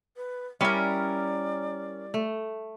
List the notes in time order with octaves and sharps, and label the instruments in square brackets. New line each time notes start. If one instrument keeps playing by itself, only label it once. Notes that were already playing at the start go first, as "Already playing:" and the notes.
[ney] B4
[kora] G3 E4 [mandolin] C#4 A#4 [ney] D5
[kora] A3